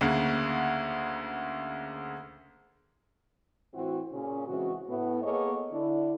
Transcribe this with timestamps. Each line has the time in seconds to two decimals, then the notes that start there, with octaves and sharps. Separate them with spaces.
0.01 D2 C#3 A#3 F#5
3.74 A2 E3 C4 E4 F#4
4.13 A#2 C#3 C#4
4.48 C#3 E3 G#3 C4 F#4
4.88 A2 A3 B3
5.23 A#3 B3 G#4 A4 C#5 D#5
5.71 D3 D4 E4